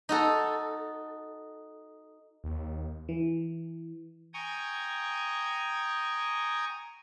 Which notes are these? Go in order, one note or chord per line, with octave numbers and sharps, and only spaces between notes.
D#4 F#4 A4
D#2
E3
G5 G#5 A#5 C#6 D#6